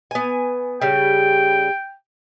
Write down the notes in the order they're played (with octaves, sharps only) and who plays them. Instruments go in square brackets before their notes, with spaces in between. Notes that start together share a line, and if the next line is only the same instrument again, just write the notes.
[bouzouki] B3 G#5
[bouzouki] C#3 G3 [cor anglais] G5